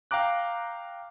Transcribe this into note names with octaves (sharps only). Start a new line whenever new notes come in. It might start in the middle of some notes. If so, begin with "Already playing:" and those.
F5 G5 A#5 D6 F#6